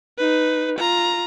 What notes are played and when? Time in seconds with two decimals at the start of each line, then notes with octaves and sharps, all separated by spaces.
0.18 D#4 B4
0.79 F4 A#5